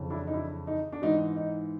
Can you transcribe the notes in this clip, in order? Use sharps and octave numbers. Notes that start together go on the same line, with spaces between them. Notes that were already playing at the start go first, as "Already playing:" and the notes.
Already playing: F2 C#3 E3
D4 E4
D#4
D4 E4
D#4
D4
G#2 E3 D#4
D#4